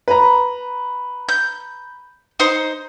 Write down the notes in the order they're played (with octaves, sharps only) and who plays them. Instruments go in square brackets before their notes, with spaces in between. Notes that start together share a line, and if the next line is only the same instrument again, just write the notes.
[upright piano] B4 A#5
[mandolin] G6
D#4 C5